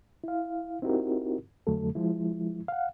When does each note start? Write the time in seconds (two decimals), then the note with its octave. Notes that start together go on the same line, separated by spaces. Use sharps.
0.24 E4 F5
0.82 C4 D#4 E4 F#4 G4 A#4
1.67 F2 D3 F#3 A3 A4
1.95 F3 G#3 E4
2.68 F5 F#5